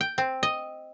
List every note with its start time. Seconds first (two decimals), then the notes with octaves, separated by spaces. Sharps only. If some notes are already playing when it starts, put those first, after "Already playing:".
0.01 G5
0.18 C4
0.43 D#5